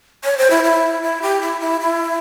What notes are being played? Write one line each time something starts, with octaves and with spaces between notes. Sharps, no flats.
C#5
C5
E4
E4
E4
G4
E4
E4
E4